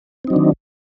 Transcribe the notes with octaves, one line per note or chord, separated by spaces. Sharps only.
D#3 F#3 C4 D4 D#4